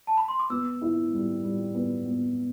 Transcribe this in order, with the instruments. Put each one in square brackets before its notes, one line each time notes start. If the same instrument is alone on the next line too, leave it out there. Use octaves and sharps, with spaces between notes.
[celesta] A5
B5
C6
D6
[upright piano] B3 [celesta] E6
[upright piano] E4
G3
G3
B3
B3